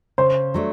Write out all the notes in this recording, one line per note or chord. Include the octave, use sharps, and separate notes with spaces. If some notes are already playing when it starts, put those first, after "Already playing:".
C#3 C5
F#3 A3 D4